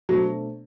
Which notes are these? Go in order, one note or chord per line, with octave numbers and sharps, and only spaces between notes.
B2 F#3 A3 D4 A4 C5